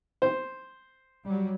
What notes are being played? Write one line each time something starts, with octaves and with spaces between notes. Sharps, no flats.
C5
F#3 G3